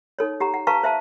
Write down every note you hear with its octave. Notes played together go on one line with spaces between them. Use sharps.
D#4 A4 C#5
G4 F#5 A#5
F#5
B4 F5 A5 A#5 C#6
C5 E5 F5 A5